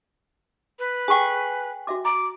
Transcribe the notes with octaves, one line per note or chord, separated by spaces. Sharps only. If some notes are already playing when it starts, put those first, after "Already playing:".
B4
G#4 A4 G5 G#5 C#6
F#4 E5 D6
A#5 D6